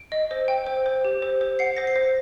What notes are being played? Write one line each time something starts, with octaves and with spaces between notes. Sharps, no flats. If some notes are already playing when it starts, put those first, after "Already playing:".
Already playing: D7
D#5
C5
G5
C5
C5
G4
C5
C5
F#5 C7
C5 A#6
C7
C5